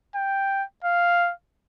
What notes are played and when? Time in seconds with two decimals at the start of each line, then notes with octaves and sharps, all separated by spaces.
0.15 G5
0.84 F5